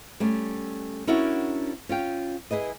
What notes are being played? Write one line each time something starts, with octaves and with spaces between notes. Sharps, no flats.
G3 A3 C#4
C#4 D4 E4 F#4 A#4
C#4 F4 G5
E4 G#4 B4 D#5